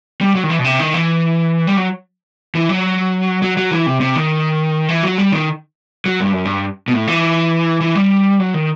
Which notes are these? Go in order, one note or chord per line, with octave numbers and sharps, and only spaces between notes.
G3
F#3
D#3
E3
B2
C3
D#3
E3
G3
F#3
E3
F#3
F#3
F#3
E3
C3
C3
D#3
E3
F#3
G3
D#3
F#3
G2
F#2
G2
B2
A2
E3
E3
G3
F#3
D#3